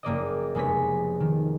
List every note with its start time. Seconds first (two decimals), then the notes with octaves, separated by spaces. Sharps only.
0.03 F#1 A#3 D5 D#5
0.55 F1 G#3 B3 C#5 B6
1.20 D#3